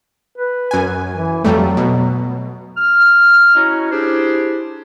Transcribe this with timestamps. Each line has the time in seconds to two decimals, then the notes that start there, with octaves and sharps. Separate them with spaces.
0.38 B4
0.71 F#2 G#5
1.12 E3
1.45 F2 F#3 G3 A3
1.77 B2
2.77 F6
3.54 C#4 E4 F#4 C#5 D#5 A#5
3.90 D4 E4 G4 G#4 C5